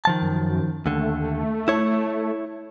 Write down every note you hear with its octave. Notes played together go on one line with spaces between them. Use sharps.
D#3 F3 A5
F#2
D#2 D3 A3
E4 C#5